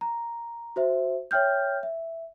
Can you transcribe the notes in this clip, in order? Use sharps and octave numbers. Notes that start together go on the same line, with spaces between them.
A#5
F#4 C5 E5
C#5 E5 G5 F6 G6
E5